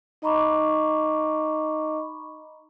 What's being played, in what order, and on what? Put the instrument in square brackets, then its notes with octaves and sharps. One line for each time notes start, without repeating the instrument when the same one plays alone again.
[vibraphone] D#4 D#5 A#5 B5 C#6 D6